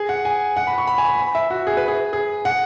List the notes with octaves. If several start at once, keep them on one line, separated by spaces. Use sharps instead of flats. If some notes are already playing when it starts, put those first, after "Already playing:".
Already playing: G#4
F#5
G#5
F#5
B5
C#6
B5
G#5
B5
B5
E5
F#4
G#4
B4
G#4
G#4
F#5